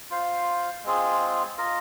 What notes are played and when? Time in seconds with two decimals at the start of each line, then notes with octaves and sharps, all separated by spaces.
0.10 F4 C5 F5
0.84 G#3 C4 F4 G#4
1.57 F4 A#4 D#5